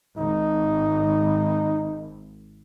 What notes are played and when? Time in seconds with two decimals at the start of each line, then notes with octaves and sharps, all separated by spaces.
0.18 G#1 D#4